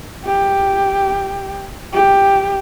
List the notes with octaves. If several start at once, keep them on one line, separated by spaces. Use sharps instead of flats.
G4
G4